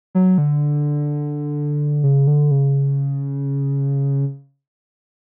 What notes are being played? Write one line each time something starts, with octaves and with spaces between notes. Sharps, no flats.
F#3
D3
C#3
D3
C#3